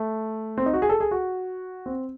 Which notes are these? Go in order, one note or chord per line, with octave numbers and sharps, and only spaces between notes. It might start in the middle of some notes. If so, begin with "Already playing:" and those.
Already playing: A3
C4
D#4
F#4
G#4
A4
G#4
F#4
C4